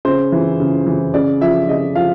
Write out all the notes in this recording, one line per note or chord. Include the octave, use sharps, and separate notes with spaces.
C#3 C5
E3
C#3
E3
C#3 D5
F3 E5
C#3 D#5
F3 F5